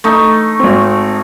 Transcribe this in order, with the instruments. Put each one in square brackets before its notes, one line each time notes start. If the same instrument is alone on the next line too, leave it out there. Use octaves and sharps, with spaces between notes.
[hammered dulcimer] A3 D#4
[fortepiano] G#1 C4